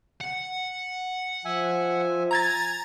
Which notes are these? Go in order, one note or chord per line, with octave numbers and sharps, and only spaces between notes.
F#5
F3 E5 G#5
G#5 A#5 G#6 A6